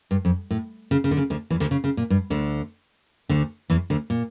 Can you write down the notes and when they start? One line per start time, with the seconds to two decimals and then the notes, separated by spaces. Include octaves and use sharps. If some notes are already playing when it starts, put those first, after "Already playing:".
0.11 G2
0.25 F2
0.51 A2
0.91 C#3
1.04 C#3
1.11 D3
1.17 C#3
1.30 D2 D3
1.50 E2 E3
1.60 D2 D3
1.71 C#3
1.84 C#3
1.97 A#2
2.10 G2
2.30 D2 D3
3.29 D2 D3
3.70 E2 E3
3.90 D2 D3
4.10 A#2